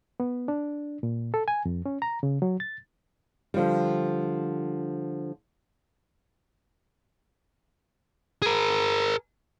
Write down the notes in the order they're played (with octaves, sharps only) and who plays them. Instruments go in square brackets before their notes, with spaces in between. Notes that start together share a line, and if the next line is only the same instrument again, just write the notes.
[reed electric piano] B3
D4
A#2
A4
G#5
F2
C#4
A#5
C#3
F#3
A6
[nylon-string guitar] D3 F3 G3
[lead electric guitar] G#4 A#4